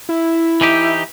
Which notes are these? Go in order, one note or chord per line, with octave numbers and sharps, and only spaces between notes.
E4
E3 D#4 G4